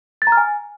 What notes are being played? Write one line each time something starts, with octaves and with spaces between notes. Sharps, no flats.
A6
A#5
F6
G#5